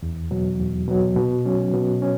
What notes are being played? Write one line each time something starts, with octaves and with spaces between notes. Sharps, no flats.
E2
B2 F#3
E2
B2 F#3
B2
F#3 C#4
B2
C#4